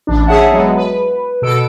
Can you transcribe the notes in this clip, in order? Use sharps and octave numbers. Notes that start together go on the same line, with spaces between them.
A1 D4
G#4 C#5 E5 F#5 A5
F#3 G#3 B3
B4
B2 A4 E6 D7